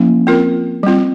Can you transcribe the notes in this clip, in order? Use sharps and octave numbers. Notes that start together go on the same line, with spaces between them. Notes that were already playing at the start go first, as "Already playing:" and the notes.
Already playing: F3 A#3 C#4 E4
C4 F4 A#4
G3 C4 F4